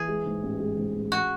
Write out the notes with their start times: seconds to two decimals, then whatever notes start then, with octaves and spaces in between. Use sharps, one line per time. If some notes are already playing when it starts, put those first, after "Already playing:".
Already playing: E3 G#4
0.08 G#3
0.25 G#2
0.43 A1
0.60 G#3
0.77 G#2
0.95 A1
1.12 G#3 F#4